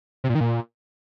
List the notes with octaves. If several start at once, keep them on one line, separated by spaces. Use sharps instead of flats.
C3
A#2
D#3
A#2